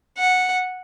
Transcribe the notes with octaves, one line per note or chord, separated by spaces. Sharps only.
F#5